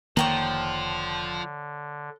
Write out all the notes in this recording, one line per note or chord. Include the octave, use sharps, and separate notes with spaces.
F1 D3 D#3 F3 A#3 C#5 G5 A#5